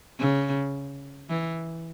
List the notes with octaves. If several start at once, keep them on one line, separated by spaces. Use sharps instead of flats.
C#3
E3